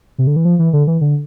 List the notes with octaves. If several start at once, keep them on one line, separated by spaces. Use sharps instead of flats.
C3
D3
E3
F3
E3
D3
E3
D3